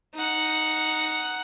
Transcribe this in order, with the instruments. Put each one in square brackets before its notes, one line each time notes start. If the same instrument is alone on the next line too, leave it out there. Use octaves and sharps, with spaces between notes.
[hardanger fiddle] D#4 F#5